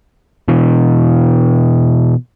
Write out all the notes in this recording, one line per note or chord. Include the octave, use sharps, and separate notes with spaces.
B2 E3